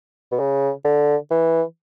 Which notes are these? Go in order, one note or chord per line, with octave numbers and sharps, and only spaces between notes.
B2
C#3
D3
E3